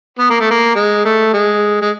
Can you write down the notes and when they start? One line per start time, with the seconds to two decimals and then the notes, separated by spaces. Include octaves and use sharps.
0.19 B3
0.30 A#3
0.40 A3
0.51 A#3
0.76 G#3
1.05 A3
1.33 G#3
1.82 G#3